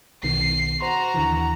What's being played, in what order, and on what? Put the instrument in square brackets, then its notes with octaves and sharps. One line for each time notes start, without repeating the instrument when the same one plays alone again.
[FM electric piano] B1 B2 D#3 [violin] C7
[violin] F#4 A#5 [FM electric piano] C5 C6
[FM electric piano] D#2 D3 E3